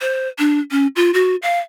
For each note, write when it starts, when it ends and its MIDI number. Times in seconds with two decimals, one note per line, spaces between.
0.01 0.28 72
0.39 0.59 62
0.71 0.87 61
0.96 1.11 65
1.14 1.36 66
1.42 1.59 77